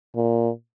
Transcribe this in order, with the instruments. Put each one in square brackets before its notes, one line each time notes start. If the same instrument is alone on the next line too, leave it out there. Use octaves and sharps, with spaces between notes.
[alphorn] A#2